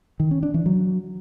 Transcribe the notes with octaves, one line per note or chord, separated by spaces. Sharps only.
D#3
C#4
D4
E3
F#3